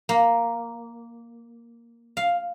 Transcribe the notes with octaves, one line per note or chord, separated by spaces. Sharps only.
A#3
F5